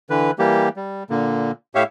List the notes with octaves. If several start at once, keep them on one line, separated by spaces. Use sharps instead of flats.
D3 E3 B4
E3 G3 A#3 G4
G3
A#2 D3 A#3
A2 G4 C#5 E5 F5